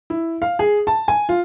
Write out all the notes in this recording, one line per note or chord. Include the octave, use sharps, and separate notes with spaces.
E4
F5
G#4
A5
G#5
F4